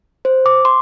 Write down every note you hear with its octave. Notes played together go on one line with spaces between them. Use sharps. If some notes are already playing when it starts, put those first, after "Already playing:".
C5
D6
C6